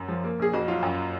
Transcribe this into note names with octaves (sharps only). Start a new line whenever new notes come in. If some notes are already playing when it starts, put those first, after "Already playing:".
Already playing: F#2
F3
A#3
A#1 G#4
F2 F#4
F#3 F4
F#2